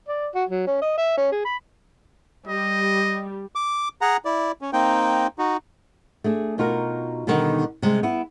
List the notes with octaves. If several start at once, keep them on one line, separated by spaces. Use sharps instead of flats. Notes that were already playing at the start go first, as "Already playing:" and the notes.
D5
F#4
F#3
C#4
D#5
E5
C#4
G#4
B5
G3 D#5
D6
G#4 F#5 A#5
E4 D5
C#4
A#3 C4 D#4 G5
D#4 F#4
A3 D4 G#4
B2 D#4 F4 F#4 A#4
B2 D3 D#3 G3 B3 D#4
C3 G3 G#3 C4
B3 E4